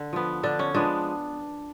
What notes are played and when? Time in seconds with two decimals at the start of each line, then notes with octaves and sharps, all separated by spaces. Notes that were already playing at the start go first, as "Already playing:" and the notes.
Already playing: D3
0.13 F3 B3
0.43 D3 D4
0.59 C#4
0.74 F3 G#3 B3 D4